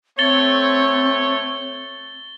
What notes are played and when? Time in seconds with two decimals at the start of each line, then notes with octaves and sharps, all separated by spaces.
0.19 A3 C4 C#5 A6 G7